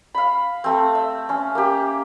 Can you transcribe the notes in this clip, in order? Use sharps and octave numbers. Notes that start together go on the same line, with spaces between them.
F5 B5
A3 C4
E5
C#4 C6
A#3 G4